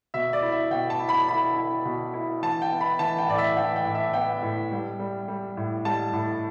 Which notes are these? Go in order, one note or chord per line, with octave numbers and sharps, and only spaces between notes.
B2 E5
D5
E4
E5
B2 G5
A5
E4
B5
E4 B5
E4
B2
E4
E3 A5
G5
B3
B5
E3 A5
G5
A2 D5
E5
E3 G5
G5
A2
E5
B3 G5
A2
G3
G3
G3
A2
G3 A5
A2